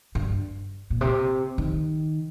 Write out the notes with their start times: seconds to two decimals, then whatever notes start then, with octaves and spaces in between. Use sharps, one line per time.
0.15 G2
0.90 A#2
1.01 C3
1.58 D#3